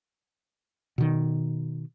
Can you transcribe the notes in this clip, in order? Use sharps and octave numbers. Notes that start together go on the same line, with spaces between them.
B2 D#3